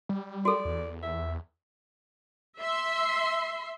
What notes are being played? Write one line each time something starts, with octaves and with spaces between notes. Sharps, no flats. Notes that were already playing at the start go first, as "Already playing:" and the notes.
G3
F#4 A4 D5
E2
E5
E5 C6